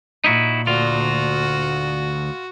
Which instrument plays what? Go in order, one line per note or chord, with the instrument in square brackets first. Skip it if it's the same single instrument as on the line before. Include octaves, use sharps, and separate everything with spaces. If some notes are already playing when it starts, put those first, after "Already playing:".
[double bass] A#2 [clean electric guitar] D#4 E4 F#4
[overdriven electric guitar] D2 D5 [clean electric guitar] F4 [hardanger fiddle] F#4